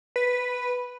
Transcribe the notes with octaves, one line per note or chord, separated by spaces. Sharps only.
B4